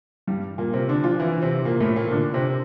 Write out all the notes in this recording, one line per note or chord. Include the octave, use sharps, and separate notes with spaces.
G2 G3
A#2 A#3
C3 C4
D3 D4
F3 F4
E3 E4
C3 C4
A#2 A#3
A2 A3
A#2 A#3
D3 D4
C3 C4